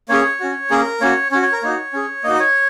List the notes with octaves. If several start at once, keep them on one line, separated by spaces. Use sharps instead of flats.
A#3 C#4 G#4 C#5
C#4 F#4
A#3 C#4 G#4 A#4
A#3 C#4 F#4 C#5
C#4 F#4 C#5
C#5
A#4
A#3 D#4 F#4 C#5
C#4 G#4
A#3 D#4 F#4 D#5
C#5